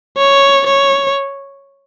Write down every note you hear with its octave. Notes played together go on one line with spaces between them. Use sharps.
C#5
C#5